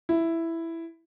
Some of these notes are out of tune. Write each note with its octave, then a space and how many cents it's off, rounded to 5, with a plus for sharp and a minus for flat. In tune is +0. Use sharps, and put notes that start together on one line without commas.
E4 +5